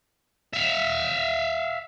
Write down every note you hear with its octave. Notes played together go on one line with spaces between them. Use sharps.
E5 F5